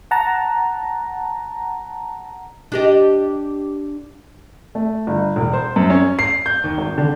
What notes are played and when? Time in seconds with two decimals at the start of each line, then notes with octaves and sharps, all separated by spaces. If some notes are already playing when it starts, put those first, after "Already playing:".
0.11 F#5 A5 A#5
2.72 D4 G4 D#5
4.75 A3
5.07 G1
5.36 E1
5.53 C5
5.76 F#2
5.90 C#4
6.19 C7
6.46 G6
6.64 D#2
6.78 G#1
6.98 D3